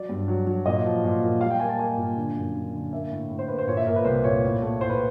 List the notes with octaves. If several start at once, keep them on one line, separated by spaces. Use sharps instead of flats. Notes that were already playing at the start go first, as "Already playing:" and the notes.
Already playing: F#3 D5
G2
F#3
F#3
A#2 D#5
F3
A#2
A#2
G3 F5
G5
A#3 G#5
A5
A#3 G#5
A#2
D3
F#2
D3
D3
A#3 E5
A2
A2
C5
A#3 B4
C5
A#2 C#5
E5
A#2 A#4
B4
C2 C5
A#2 C#5
A2
A3
A2 C5
B4